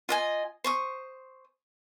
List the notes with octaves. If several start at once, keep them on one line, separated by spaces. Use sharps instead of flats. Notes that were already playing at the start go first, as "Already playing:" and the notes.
F4 D#5 G#5
C5 C#6 D#6